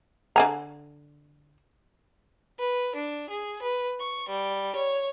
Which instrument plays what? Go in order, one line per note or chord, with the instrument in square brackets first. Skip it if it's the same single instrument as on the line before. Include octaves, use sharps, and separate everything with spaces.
[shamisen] D3 G#5 A#5
[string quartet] B4
D4
G#4
B4
C#6
G3
C#5